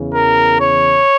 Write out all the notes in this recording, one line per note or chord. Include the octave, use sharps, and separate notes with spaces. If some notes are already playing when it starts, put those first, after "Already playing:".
Already playing: E2 C#3 E3
A#4
C#5